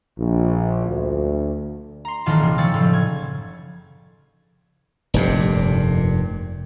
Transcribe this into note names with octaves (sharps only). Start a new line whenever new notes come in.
A#1
D2
A#5 C6
D#1 D#3 E3 G#3 F4 A5
C3 E3 A#3
F3 G#3 C#5 E6 A6
F#1 A2 C#3 F3
G#6
F1 G2 A#2